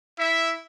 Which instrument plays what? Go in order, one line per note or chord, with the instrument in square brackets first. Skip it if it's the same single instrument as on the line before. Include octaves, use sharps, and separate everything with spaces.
[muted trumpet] E4 [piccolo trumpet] E5